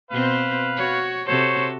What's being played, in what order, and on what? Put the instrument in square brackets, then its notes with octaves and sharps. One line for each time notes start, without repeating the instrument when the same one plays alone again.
[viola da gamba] B2 C4 C5 [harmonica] B4 F5
[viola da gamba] F#4 C#5
[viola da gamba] C3 F#4 A4 [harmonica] C5 C#5